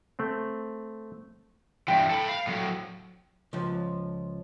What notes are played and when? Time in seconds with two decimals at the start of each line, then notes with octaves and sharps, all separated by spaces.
0.19 A3 C4
1.88 G2 E3 G5
2.10 A4 B5
2.29 F5
2.47 A2 F#3
3.53 C#2 F3